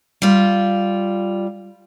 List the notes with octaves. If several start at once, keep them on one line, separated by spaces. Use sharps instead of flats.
G3 F4